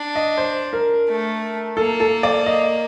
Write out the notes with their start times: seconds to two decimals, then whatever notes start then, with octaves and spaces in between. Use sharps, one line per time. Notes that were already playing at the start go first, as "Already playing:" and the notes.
Already playing: D4
0.15 D#5
0.37 C5
0.73 A#4
1.08 A3
1.77 A#3 A4
2.00 A4
2.23 D5
2.46 D#5